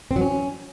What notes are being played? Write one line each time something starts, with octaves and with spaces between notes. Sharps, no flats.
C4
F#3
C#4